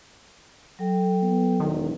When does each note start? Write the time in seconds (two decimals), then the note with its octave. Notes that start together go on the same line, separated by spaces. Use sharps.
0.79 F#3 A4 G5
1.22 B3
1.60 E1 D#3